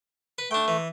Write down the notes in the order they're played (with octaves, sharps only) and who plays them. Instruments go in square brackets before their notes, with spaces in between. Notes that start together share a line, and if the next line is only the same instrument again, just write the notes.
[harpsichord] B4
[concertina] A3 [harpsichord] D4 G5
[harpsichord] E3